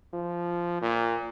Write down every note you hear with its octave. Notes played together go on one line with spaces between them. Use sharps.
F3
A#2